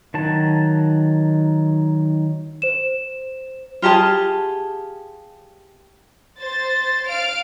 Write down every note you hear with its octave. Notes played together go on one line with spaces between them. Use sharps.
D#3 F#3 A5
C5 E7
F4 G4 G#4 A5
C5 A6
F5 F6 D7